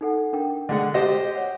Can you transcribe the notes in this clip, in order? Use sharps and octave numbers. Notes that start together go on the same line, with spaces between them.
D#4 A4 F#5
D4 A#4 G5
D3 G#3 F#5
G4 C5 D#5 A#6
C#5 F#5